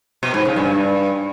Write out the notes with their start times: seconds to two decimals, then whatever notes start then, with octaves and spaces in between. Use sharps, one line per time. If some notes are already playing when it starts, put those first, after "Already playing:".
0.23 B2
0.34 G#2
0.45 C#3
0.56 G2